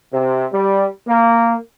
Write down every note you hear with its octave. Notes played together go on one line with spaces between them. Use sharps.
C3
G3
A#3